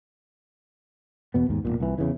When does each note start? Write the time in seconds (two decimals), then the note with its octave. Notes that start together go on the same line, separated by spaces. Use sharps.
1.34 E2 B2 B3
1.49 D#2 G#2
1.65 E1 C2 A#2
1.80 C2 E3
1.98 E2 C#3 E3